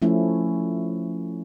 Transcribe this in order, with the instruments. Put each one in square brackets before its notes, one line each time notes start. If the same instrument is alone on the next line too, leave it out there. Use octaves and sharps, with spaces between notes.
[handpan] F3 A3 C#4 E4